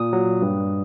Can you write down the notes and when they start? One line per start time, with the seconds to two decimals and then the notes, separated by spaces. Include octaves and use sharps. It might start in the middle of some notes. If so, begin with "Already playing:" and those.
Already playing: A#2 D#6
0.13 F#3
0.42 G2